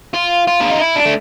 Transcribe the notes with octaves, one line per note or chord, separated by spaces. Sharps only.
F4
F4
D4
D#4
E4
D4
A3